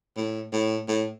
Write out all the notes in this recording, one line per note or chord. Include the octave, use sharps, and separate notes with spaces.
A2
A2
A2